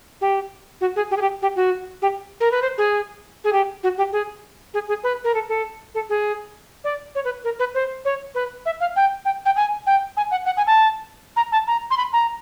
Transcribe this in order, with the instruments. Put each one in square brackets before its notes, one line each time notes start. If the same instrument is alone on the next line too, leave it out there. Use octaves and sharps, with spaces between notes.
[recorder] G4
F#4
G#4
G4
G#4
G4
G4
F#4
G4
A#4
B4
C5
G#4
G#4
G4
F#4
G4
G#4
G#4
G#4
B4
A#4
A4
A4
A4
G#4
D5
C#5
B4
A#4
B4
C5
C#5
B4
E5
F5
G5
G5
G5
G#5
G5
G#5
F#5
F#5
G#5
A5
A#5
A5
A#5
C6
B5
A#5